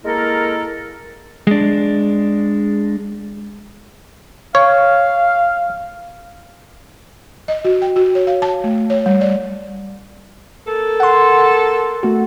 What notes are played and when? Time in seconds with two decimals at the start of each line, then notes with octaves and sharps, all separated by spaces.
0.05 G#3 A#3 E4 A4 A#4
1.47 G#3 D4
4.55 C#5 F5
7.48 D#5
7.65 F#4
7.82 G5
7.96 F#4
8.15 C#5
8.27 F5
8.42 A5
8.64 A3
8.90 C#5
9.06 G3
9.21 D5
10.66 A#3 A4
11.00 F#5 C6
12.03 A3 F#4